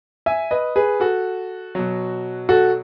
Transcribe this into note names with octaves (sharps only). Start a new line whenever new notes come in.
E5 G#5
B4 D#5
G#4 B4
F#4 A4
B2 F#3
F#4 A4